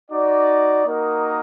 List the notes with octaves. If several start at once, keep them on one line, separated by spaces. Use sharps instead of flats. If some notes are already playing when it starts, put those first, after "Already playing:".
D#4 F#4 D5
A#3 D#4 F#4 A#4 D#5